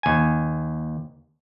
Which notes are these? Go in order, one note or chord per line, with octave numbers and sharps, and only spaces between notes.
D#2 G#5